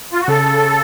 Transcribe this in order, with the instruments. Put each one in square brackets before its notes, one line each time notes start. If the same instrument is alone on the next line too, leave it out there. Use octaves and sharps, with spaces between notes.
[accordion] F4
F#4
[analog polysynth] C#3 [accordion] A4